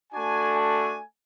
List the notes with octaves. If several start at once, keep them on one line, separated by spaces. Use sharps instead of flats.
A3 D4 F#4 G#5
G#5